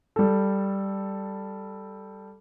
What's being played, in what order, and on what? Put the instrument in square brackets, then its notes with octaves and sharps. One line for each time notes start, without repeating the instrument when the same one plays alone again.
[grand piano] G3 A4